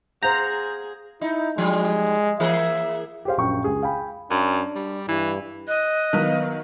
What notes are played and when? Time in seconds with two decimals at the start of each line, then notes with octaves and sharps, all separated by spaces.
0.23 G#4 C5 F5 F#5 A#5 G6
1.21 D#4 E4
1.58 F3 G3 G#3
2.40 E3 A#3 G#4 E5
3.25 G4 G#4 C5 F5
3.37 A#1 F#2 G5 C#6
3.64 C#2 G#4
3.82 F5 G5 G#5 B5
4.31 F#2 D4
4.75 G3
5.08 G2 E3
5.68 D#5 F#6
6.13 D#3 F#3 B3 B4 F5